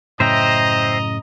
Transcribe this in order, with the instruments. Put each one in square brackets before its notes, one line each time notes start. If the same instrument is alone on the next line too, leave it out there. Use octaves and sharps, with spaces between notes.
[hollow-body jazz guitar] F#2 A2 C#3 [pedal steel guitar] C5 E5 G5 [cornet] D#5 [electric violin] A#5